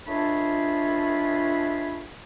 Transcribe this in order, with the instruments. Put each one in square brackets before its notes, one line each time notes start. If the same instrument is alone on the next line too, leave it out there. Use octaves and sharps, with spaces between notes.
[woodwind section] C#2 A3 D4 F4 G#4 B5